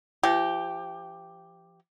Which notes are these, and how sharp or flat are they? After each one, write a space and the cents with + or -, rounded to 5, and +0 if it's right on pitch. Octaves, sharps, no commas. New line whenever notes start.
F3 -40 G4 +0